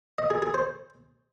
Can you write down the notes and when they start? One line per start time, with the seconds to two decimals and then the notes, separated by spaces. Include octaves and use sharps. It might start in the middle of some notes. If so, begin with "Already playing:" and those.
0.18 D#5
0.30 G#4
0.42 G#4
0.54 C5